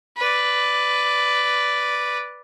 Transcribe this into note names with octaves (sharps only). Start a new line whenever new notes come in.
B4 D5